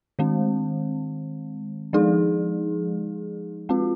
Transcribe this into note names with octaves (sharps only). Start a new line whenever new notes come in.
D#3 G#3 C4
F3 G#3 D#4 G#4
G#3 C4 F4